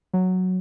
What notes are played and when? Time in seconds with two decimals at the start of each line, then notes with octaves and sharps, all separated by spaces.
0.13 F#3